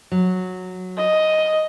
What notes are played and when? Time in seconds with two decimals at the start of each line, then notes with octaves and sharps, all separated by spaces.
0.11 F#3
0.97 D#5